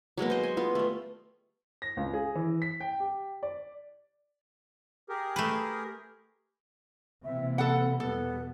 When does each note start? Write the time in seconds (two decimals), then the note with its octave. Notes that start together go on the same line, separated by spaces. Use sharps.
0.17 F#3 G#3 A#3 B3
0.30 C5 D#5
0.43 G#5
0.57 B3 F4
0.75 G3 A3
1.82 A#6
1.97 C#2
2.14 G#4
2.35 E3
2.62 B6
2.80 G5
3.00 G4
3.43 D5
5.09 G4 G#4 A#4
5.36 A3 B4
7.24 C3 E3 A#3 E5
7.58 A4 F#5 B5
8.00 E2 B2 G3 B3 A4